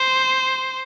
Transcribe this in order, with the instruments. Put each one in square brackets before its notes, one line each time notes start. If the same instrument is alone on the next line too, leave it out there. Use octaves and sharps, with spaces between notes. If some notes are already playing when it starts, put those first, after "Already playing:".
Already playing: [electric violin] C5